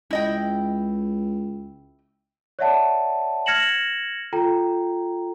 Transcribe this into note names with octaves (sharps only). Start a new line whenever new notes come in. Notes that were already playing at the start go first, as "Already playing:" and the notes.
C#2 E4 D#5 G5
C#5 D5 E5 F#5 A5
F6 G#6 A#6 C#7 E7 F#7
F4 A4 G5 A#5